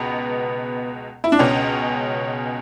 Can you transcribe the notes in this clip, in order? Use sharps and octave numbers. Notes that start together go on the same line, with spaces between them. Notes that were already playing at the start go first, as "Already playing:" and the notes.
Already playing: C#2 B2 B3
E4
D4
C#2 B2 C#4